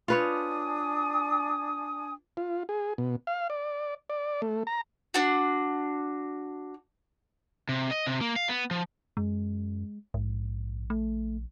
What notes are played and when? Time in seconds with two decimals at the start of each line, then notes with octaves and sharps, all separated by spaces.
0.08 D4 F4 B4 C#5 G#5 D#6
2.37 F4
2.69 G#4
2.98 B2
3.27 F5
3.50 D5
4.10 D5
4.42 A3
4.67 A#5
5.14 D4 F#4
7.69 C3
7.91 D#5
8.07 C3
8.21 A#3
8.36 F5
8.49 B3
8.71 F3
9.17 F#2 G#3
10.14 A#1 G#2
10.90 A3